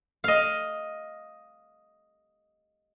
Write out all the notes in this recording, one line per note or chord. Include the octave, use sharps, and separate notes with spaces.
D#5 F5